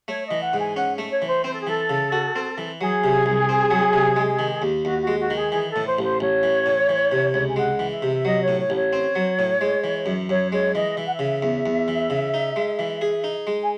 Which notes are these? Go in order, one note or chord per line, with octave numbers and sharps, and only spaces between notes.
A3 C#5
D#5
E3
F#5
G#2
G#5
C#4 F#5
A3
C#5
E3
C5
C4 C5
A4
G#4
E3 A4
C#3
F#4
C4
E3
F#3 G#4
C3
C2
C4
F#3
C3
G#3
D#3
D#2
D#2 F#4
F#4
G#3
F#4
D#3
G#4
E3 G#4
A4
A2
C5
A1
C5
A1 C#5
E3
A2
E3
C3
C#2
G#5
G#3 F#5
E3
E5
C3
E5
F#3 D#5
C#5
A2
C#5
A1
C#5
C4
F#3
A2
G#3
E3
F#2
F#2 C#5
G#3 C#5
E3 D#5
E3 E5
F#5
E5
C#3
E2
E2
E3
C#3
D#4
G#3
E3
G#4
D#4
G#3
G#5